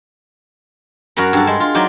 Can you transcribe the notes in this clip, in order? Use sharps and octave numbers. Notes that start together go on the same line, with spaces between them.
F#2 F#4 A#4 A#5 B5
G2 A4
G#3
F4
F#3 D#4 C5 D5